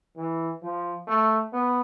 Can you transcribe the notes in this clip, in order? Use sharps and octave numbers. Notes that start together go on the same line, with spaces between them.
E3
F3
A3
B3